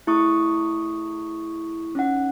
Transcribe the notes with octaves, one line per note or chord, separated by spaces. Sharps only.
A3 E4 G#4 C#6 D#6
C#4 D#4 F#5